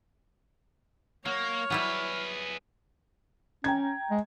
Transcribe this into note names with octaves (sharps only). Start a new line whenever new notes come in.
F#3 A#3 C#5 F6
F#3 G3 E4 G#4 B4
C#4 G5 A#5 G#6
G#3